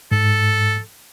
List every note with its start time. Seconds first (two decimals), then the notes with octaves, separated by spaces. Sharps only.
0.12 G#2 A4